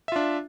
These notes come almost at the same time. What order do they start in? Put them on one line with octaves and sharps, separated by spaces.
E5 F4 D4